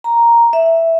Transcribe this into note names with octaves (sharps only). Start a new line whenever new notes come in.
A#5
E5